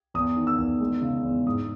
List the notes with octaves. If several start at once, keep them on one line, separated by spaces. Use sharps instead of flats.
E2 D#6
D#3
E6
E2
G#3
C#3
E2
G#2 D#6